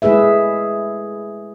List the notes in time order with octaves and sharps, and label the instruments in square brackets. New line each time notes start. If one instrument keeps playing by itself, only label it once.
[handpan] G#3 A3 E4 G#4 B4 E5